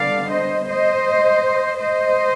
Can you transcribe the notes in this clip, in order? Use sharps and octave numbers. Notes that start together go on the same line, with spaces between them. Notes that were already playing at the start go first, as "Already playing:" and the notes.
Already playing: D3 G3 B3 D4 D5 F5
C5 D#5
C5 D#5
C5 D#5